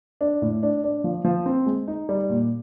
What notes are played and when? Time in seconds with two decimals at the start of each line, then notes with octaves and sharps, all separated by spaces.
0.21 D4
0.42 A2
0.63 D4
0.84 D4
1.04 F3
1.25 F3
1.46 C4
1.66 G#3
1.88 D#4
2.09 G3
2.29 A#2